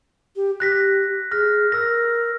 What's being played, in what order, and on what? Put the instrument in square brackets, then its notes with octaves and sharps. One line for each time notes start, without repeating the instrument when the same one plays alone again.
[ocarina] G4
[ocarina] G4 [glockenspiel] F#6 A#6 B6
[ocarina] G#4 [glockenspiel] F6 A#6
[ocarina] A#4 [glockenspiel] E6 A#6